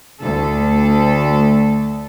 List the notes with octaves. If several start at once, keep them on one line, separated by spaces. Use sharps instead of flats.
D2 A4